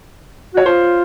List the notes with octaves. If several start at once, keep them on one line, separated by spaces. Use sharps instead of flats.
F#4 C#5
F4 C5